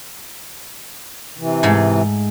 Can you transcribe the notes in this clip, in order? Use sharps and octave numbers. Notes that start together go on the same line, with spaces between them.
C3 E3
G#2 G#3 A3